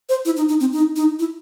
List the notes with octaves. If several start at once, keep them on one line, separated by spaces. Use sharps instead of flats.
C5
E4
D#4
D#4
C4
D#4
D#4
E4